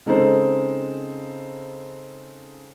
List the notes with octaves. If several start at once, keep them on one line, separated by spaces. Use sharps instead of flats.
C#3 G#3 C4 D#4 A4 C5